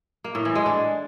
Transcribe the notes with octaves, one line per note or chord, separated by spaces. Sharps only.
A#3
A2
E3
G#3
D4